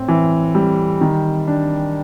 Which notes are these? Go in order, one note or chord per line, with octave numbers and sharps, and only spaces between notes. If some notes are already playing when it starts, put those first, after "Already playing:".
Already playing: A2 C4
E3
G3
D#3
D4